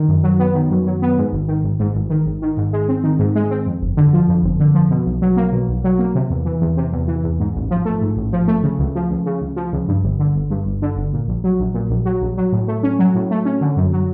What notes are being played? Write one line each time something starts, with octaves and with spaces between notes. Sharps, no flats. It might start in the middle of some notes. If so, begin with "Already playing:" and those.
Already playing: D#3
F#2
F#3
B3
D#3
F#2
F#3
B3
G#2
G#1
D#3
G#1
G#2
G#1
D#3
G#1
D#3
G#2
G#3
C4
D#3
G#2
G#3
C4
F2
G1
D3
F3
F2
G1
D3
F3
B2
B1
F#3
A#3
B2
B1
F#3
A#3
C3
E2
E3
E2
C3
E2
E3
E2
G#2
A1
F3
A3
G#2
A1
F3
A3
C#3
C#2
F3
C#2
C#3
C#2
F3
C#2
G2
G1
D3
G1
G2
G1
D3
G1
A#2
A#1
F#3
A#1
A#2
A#1
F#3
A#1
F#3
A2
A3
C#4
F#3
A2
A3
C#4
D3
F#2
F#3